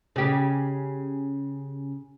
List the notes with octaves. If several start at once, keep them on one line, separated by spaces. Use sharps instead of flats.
C#3 G4